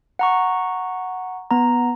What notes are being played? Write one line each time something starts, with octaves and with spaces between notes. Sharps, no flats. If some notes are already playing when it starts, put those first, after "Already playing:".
F#5 A#5 C#6
B3 A#5